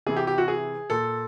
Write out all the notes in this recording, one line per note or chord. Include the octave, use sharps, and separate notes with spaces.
C3 E3 G#4
G4
G4
F#4
G#4
A#2 A4